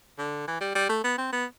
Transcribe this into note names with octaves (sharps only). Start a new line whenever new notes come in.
D3
E3
G3
G3
A3
B3
C4
B3